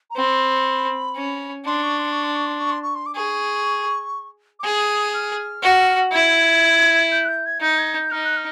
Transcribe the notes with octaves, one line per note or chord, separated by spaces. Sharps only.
A#5
C4 B5
C#4
D4 C6
C#6
C6
C#6
C6
C#6
C6
C#6
C6
C#6
C6
D6
G#4 C#6
D6
G#4 D#6
F6
F#4
E4 G#6
G6
F#6
G6
G#6
D#4 G6
G#6
G6
D#4 F6
F#6
F6